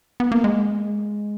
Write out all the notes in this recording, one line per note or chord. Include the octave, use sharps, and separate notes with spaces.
B3
A#3
G#3